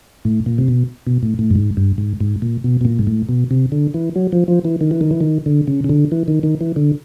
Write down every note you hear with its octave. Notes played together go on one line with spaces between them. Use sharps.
A2
A#2
C3
B2
B2
A2
A2
G2
G#2
G2
G#2
G#2
A#2
B2
B2
A#2
G#2
A2
B2
C3
D3
E3
F#3
F3
F3
E3
D#3
E3
D#3
E3
D#3
D3
C#3
C#3
D3
E3
D#3
D#3
E3
D3